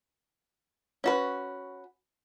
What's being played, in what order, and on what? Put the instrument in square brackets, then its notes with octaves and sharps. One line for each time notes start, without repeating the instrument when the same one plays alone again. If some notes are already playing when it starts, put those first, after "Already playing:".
[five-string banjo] C#4 F#4 B4